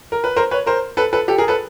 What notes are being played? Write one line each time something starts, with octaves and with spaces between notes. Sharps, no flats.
A#4
B4
A#4 C5
B4 C#5
A#4 C5
A4 B4
A4 B4
G4 A4
G#4 A#4
A4 B4